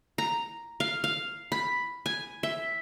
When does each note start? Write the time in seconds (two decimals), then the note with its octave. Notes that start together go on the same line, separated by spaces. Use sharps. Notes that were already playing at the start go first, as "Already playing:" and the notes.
0.18 A#5
0.80 F5
1.04 F5
1.52 B5
2.06 G#5
2.43 E5